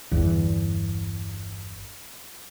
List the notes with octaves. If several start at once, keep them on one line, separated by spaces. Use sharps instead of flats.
G1 E2